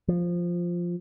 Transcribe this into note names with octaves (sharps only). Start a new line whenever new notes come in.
F3